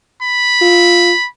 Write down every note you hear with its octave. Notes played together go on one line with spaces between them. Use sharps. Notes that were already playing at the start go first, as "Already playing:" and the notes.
B5
F4